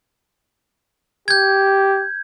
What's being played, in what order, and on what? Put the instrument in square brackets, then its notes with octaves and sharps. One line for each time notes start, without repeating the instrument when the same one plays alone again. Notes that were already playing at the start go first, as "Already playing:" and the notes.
[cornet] G4 [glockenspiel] G6 G#6